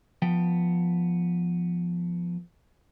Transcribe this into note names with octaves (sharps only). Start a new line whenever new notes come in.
F3 B3 G5